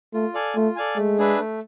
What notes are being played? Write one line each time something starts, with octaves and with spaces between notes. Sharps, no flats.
A3 F4
A4 D5 F5 G#5
A3 F4
A4 D5 F5 G#5
G#3 A3
D4 G#4 B4 E5
A3